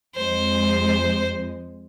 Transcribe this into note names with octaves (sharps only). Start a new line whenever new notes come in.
F2 G#3 C5